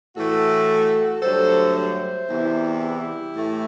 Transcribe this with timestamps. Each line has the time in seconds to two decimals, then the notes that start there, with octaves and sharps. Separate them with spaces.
0.15 A2 E3 A3 F#4 A4
1.22 G2 D3 F#3 A3 A4 C5
1.74 C5 E5
2.28 E2 C3 E3 G3
2.80 E4 G4
3.34 A2 E3 A3